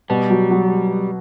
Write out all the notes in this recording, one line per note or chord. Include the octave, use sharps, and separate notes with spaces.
B2 G3
F#3
F#3